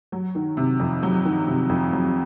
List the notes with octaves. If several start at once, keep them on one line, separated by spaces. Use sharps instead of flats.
F#3
D#3
C3
F2
F#3
D#3
C3
F2
F#3